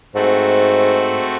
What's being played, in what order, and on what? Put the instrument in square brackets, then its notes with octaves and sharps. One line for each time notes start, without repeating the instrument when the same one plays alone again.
[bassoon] G#2 [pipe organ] A3 C4 F#4